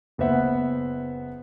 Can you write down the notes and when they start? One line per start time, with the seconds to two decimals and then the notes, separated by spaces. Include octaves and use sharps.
0.18 F#1 B3 C5 E5 F#5